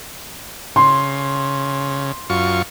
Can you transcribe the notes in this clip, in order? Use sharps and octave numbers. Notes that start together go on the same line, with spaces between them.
C#3 C6
F#2 F4 C#6